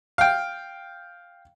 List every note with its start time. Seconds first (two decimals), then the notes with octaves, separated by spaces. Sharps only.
0.18 F5 G5